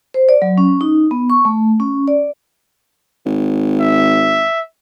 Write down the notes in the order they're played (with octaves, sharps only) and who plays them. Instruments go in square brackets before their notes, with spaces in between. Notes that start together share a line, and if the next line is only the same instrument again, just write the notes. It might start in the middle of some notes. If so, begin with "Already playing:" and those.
[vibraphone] C5
D5
F#3
C#4
D#4
B3
C#6
A3
C#4
D5
[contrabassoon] G#1
[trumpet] E5